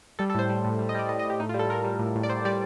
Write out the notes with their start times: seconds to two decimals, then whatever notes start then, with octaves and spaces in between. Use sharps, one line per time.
0.19 G3 A4
0.30 A4
0.35 A2 C5
0.49 G3
0.65 A2
0.79 G3
0.89 D#5
0.95 G3 D5
1.09 A2 D#5
1.19 D#5
1.25 A2
1.30 G4
1.40 A2 D#4
1.49 F4
1.54 G3
1.59 A4
1.70 G3 A#4
1.84 G3
1.99 A2
2.15 A2
2.23 D5
2.30 A2 C5
2.45 G3 D5